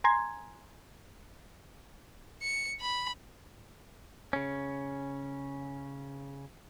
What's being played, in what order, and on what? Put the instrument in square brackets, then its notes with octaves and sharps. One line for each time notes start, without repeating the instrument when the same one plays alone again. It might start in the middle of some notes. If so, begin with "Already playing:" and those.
[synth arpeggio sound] G#5 A#5 C6 G#6
[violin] C#7
B5
[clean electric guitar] C#3 C#4